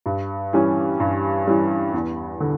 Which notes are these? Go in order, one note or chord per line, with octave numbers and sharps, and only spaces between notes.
G2
E3 G3 C#4
G2
E3 G3 C#4
E2
D3